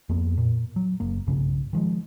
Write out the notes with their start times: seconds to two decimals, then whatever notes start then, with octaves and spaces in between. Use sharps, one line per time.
0.09 F2 A#3 B3
0.38 A#2
0.76 F#3
1.00 F#1 A#3
1.27 B1 G2 C#3 C#4
1.73 D#3 F3 G#3